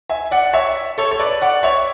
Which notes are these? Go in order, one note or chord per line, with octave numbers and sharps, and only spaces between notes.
E5 G#5
D5 F#5
C#5 E5
A4 C#5
C#5
B4 D5
D5 F#5
C#5 E5